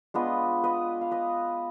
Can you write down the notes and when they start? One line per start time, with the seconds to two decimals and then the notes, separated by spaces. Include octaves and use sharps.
0.14 G#3 B3 D4 F4 B4 D#5
0.63 B4 D#5
1.01 F5
1.11 B4 D#5